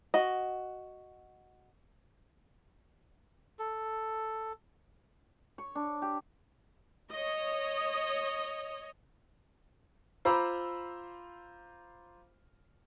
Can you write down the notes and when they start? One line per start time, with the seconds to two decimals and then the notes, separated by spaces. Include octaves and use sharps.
0.14 F#4 D#5
3.59 A4
5.58 C#5
5.75 D4
6.02 G4
7.11 C#5 D#5
10.25 F4 C5 A#5 B5 D6 E6